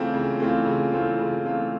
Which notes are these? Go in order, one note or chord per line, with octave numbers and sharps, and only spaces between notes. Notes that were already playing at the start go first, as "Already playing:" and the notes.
Already playing: C#3 E3 A3 C4 F4
C#3
E3 A3 C4 F4
C#3
E3 A3 C4 F4
C#3
E3 A3 C4 F4